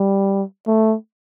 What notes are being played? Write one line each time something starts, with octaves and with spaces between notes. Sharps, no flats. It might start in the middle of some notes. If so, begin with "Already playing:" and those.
Already playing: G3
A3